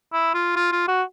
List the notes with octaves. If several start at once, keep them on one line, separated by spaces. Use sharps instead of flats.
E4
F4
F4
F4
F#4